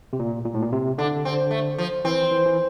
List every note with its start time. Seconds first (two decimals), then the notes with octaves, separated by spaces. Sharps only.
0.13 C3
0.19 A#2
0.45 A#2
0.54 A2
0.62 A#2
0.72 C3
0.98 D3 D4
1.25 C4
1.51 A3
1.78 F3
2.05 E3 C4
2.31 E3
2.46 E3